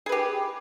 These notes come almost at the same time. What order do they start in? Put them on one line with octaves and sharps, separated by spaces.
G#4 B4 G4